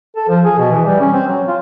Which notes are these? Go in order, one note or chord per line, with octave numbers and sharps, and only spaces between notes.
A4
F3
G#4
B2
E3
G3
C#4
C4
F#3
F4